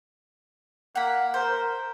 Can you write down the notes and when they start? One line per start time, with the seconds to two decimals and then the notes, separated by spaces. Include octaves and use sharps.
0.95 A#3 F#5 B5
1.34 A#4 C5